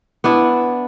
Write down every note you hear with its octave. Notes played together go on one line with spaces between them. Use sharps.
B3 D4 E4